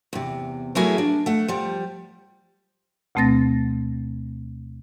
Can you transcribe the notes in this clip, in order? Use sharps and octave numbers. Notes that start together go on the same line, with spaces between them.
E2 C3
F#3 A3 E4 F#4 G#4 A#4
D4
A3 F#5
F3 G3
D2 B2 A3 C4 A6 A#6